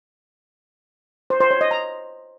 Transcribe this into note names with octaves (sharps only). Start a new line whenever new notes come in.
C5
C5
C#5
D#5
A#5